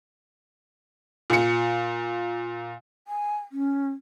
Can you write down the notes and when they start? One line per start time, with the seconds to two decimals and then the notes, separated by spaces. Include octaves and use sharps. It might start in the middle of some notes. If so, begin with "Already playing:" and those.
1.30 A#2 C#7
3.08 G#5
3.52 C#4